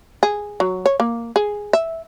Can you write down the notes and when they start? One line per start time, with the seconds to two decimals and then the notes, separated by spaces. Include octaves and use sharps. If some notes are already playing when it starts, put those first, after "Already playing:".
0.23 G#4
0.60 F#3
0.86 C#5
1.00 A#3
1.36 G#4
1.73 E5